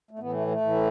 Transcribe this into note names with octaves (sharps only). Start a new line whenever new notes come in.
A3
A2 E3 B3
A3
A3
A2 E3